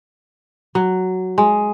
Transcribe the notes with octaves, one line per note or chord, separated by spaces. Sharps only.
F#3
G#3